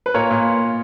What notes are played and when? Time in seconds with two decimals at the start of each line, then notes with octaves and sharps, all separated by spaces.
0.06 B4
0.14 A#2 A#4 C#5
0.31 A#2